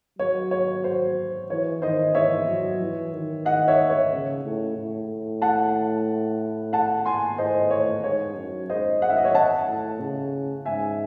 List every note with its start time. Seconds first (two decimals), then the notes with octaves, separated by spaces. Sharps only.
0.19 F#3 C#5
0.51 C#5
0.84 C5
1.50 E3 C#5
1.82 D#3 C5 D#5
2.15 E3 C#5 E5
2.48 F#3
2.81 E3
3.13 D#3
3.45 D#5 F#5
3.68 C#5 E5
3.90 C#5
4.11 C#3
4.44 A2
4.77 A2
5.42 F#5 A5
6.73 F#5 A5
7.05 G#5 C6
7.38 A2 C5 D#5
7.71 C#5
8.04 G#2 C#5
8.36 F#2
8.69 G#2 C5 D#5
9.02 F#2 F#5
9.10 E5
9.17 D#5
9.24 C#5 E5
9.35 F#5 A5
9.67 A2
10.00 C#3
10.66 G#2 E5 G#5